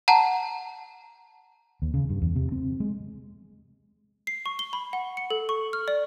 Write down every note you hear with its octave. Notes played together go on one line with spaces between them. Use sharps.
F#5 A5 A#5
D#2
C#3
G2
E2
C3
C4
G#3
C7
C#6
G7
B5
F#5
C#7
A4
C#6
F6
D5